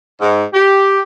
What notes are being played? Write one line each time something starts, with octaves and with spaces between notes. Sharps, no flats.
G#2
G4